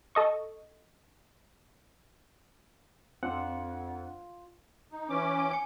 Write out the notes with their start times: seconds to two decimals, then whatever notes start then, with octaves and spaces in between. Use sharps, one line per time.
0.15 A4 D#5 C#6
3.23 F2 C4 D4 F4 C5 F#5
4.92 D#4
5.09 E3 C#4 D6
5.39 G#5
5.51 G#5 C#7